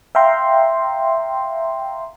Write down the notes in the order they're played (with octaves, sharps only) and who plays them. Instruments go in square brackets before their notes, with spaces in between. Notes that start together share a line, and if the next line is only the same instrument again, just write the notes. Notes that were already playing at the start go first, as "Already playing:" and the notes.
[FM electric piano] E5 F5 G5 A#5 C6